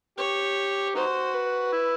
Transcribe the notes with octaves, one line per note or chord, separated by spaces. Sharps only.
G4 C#5
D#4 F#4 C5
B4
E4